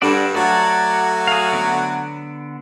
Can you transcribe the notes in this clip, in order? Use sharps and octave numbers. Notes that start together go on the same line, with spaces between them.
G2 D3 D4 F#4 D5
F#3 A3 F#4 D5 A5
G#4 F5
D3 B3 D4